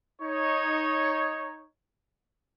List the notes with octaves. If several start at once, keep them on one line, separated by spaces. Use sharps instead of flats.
D#4 C#5